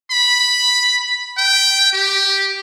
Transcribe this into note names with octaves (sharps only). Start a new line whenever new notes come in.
B5
G5
G4